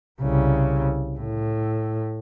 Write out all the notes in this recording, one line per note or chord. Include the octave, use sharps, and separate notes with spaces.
C2 C#3
A2